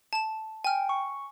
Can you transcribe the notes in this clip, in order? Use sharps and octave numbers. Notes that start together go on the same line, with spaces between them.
A5 E7
G5 G#5 F6
C#6